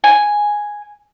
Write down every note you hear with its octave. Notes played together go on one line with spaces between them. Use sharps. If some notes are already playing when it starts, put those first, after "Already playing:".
G#5